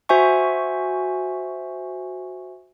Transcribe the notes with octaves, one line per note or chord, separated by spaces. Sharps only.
F#4 C5 E5 G#5 C#6